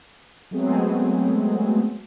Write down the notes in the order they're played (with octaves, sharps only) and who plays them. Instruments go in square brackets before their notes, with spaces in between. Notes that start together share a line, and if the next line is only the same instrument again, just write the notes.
[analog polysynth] F#3 G#3 A3 B3 C4 G#4